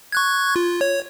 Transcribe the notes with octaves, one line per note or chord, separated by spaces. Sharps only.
C#6 F#6 G#6
F4
C#5